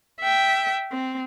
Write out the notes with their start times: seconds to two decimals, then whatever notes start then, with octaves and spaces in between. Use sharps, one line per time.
0.21 E5 G5
0.91 C4